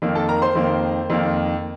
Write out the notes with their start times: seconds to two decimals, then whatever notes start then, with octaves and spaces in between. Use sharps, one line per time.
0.02 F2 D#3 A#3
0.15 A4 A5
0.28 A#4 A#5
0.42 C5 C6
0.55 F2 D#3 A#3
1.10 F2 D#3 A#3